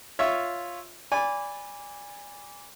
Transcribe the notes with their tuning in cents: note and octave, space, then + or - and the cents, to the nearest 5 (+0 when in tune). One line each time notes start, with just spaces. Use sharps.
F4 +0 C#5 +0 E5 +0
D5 -20 G#5 -25 B5 +0